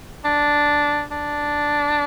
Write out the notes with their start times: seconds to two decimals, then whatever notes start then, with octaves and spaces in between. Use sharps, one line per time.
0.25 D4
1.11 D4